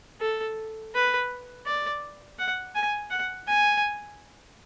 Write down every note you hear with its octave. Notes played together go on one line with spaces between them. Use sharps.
A4
B4
D5
F#5
G#5
F#5
G#5